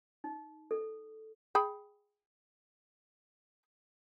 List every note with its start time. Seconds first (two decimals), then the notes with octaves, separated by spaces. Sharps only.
0.24 D#4
0.71 A4
1.55 G#4 G5 B5